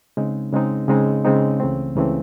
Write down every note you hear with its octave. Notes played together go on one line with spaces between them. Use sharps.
C#3 G#3 C4 D#4
C#3 G#3 C4 D#4
C#3 G#3 C4 D#4
C#3 G#3 C4 D#4
C#2 C#3 E3 A3 C4
C#2 C#3 E3 A3 C4